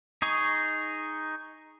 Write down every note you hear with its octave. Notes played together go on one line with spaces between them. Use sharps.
D#4 G#4 C#6